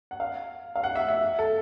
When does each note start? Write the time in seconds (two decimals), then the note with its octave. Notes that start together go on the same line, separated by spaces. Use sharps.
0.11 F#5
0.20 F5
0.76 F5
0.84 F#5
0.96 E5
1.08 E5
1.39 A4